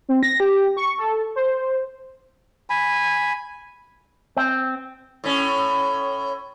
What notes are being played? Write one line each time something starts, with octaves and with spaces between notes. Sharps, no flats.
C4
A#6
G4
C#6
A4
C5
G#5 B5
C4
A2 C#4